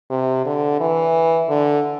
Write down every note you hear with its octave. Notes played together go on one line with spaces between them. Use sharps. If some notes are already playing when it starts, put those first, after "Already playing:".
C3
D3
E3
D3